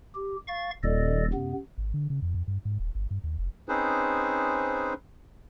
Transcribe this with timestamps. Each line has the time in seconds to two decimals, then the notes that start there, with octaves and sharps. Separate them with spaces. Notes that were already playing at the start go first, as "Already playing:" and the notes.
0.15 G4
0.48 F5 C#6 A6
0.83 D#1 A4 D5 D#5
1.34 F#2 C3 B3
1.78 G#1
1.94 D3
2.10 C#3
2.22 F2
2.34 F2
2.48 G2
2.65 G#2
2.79 D#1
2.95 G1
3.11 G2
3.24 D#2
3.38 F1
3.69 C4 C#4 D#4 G#4 B4 C5